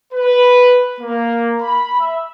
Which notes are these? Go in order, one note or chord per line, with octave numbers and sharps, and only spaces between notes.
B4
A#3
B5
E5